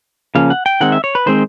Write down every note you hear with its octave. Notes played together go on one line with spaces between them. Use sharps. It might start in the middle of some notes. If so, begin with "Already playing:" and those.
C#3 F3 A#3 C#4 F5
F#5
G5
D#3 G#3 C4 F#5
E5
C#5
B4
D#3 G#3 C4 C5